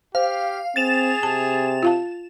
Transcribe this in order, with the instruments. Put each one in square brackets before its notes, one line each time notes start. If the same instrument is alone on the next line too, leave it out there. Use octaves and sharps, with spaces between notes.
[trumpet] G4 [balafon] C5 [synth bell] F5
[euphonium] C4 [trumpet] G#4 [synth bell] A6 E7 F7
[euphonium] C3 [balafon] A5
[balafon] F4 F5 A5